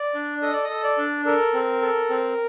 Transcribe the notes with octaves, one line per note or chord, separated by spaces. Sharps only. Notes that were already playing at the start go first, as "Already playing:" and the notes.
Already playing: D5
D4
A4 D#5
D5
D#5
A4
D5
D4
A4 A#4
C4
A4
C4